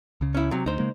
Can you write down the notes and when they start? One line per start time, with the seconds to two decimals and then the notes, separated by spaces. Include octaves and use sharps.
0.21 C#2 C#3
0.35 C#4 E4
0.51 C3 F#3
0.66 D2 D#4 C5
0.79 C#3 G#3 A#3